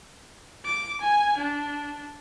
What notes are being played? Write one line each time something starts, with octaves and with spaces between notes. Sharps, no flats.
D6
G#5
D4